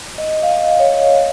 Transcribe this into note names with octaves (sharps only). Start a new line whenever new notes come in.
D#5
F5
D#5
C#5